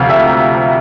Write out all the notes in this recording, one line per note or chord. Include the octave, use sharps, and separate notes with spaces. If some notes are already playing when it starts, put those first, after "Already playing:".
Already playing: D2 C3 F3 F5 F6
E5 E6
A#5